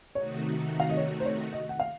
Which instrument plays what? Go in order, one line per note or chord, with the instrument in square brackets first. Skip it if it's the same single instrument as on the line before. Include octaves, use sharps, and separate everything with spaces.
[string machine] C3 D#3 A3 D#4 F#4 [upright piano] C#5
[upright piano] F5
D#5
C#5
C5
C#5
D#5
F#5
F5